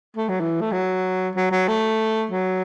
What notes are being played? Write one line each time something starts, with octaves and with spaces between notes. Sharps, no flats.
A3
F#3
E3
A3
F#3
F#3
F#3
A3
F#3